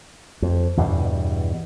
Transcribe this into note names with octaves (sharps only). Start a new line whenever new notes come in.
F2
E2 G2 B2